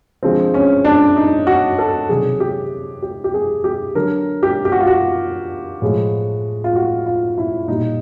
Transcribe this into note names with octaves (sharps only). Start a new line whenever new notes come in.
D3 F3 G#3 C4
C#4
D4
D#4
F#4
A4
C3 D#3 F#3 G#4
G4
G4
G4
G#4
G4
D3 F#3 A#4
G4
G4
F#4
F4
F#4
A2 F3 G#3
F4
F#4
F4
E4
A#2 G3 D#4